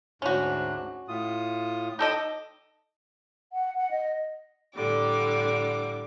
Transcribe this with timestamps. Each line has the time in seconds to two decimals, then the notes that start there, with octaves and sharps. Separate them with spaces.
0.22 D2 G#2 C#4 D4 F#4
1.08 A2 F4 D#6
1.99 D#4 A4 D#5 G5 D6
3.53 F#5
3.77 F#5
3.91 D#5
4.75 A2 D3 G3 D6